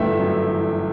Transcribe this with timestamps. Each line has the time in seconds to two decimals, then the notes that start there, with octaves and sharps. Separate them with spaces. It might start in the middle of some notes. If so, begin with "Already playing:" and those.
Already playing: G1 E3 A3 E5 G5
0.19 F#2
0.48 E3